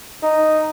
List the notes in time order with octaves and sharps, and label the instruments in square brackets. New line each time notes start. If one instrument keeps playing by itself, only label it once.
[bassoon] D#4